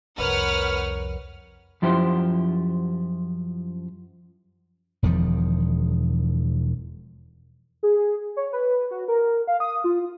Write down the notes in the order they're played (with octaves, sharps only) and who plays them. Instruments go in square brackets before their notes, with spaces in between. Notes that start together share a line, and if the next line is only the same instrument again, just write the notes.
[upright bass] C2 F2 [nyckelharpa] A#4 C#5 [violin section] B4 F#5 F6
[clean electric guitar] F#2 F3 E4 G4 C5
[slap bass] E1 E2 D#3 F3
[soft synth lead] G#4
C#5
B4
F#4
A#4
F5
D#6
F4